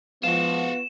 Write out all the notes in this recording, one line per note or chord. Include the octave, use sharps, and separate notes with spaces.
F3 G#3 B3 F4 F#4 E7